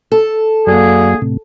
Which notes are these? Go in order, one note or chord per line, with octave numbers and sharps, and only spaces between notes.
A4
F#2 D3 F#3 A#3 G#4
A2 C3